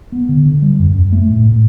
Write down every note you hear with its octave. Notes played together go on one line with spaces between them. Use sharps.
B3
D3
D3
G3
F#2
F#2
A3
A2
A2